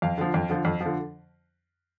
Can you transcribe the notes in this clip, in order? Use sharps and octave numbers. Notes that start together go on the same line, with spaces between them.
F2 F5
D3 F3
F2
D3 F3
F2
D3 F3